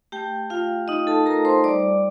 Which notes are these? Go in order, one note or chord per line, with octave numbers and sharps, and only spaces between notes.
A3 G4 G5
A3 F4 F5
D#4 D#5
A4 A5
A3 A#4 A#5
C5 C6
G3 D5 D6